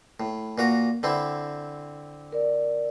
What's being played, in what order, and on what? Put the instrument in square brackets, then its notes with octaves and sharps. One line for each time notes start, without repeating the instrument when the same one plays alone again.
[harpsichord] A2
A#2 F#4 A#5
D3 C4 E4
[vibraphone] A#4 D5